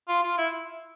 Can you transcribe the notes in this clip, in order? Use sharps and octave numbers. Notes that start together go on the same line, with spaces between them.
F4
F4
E4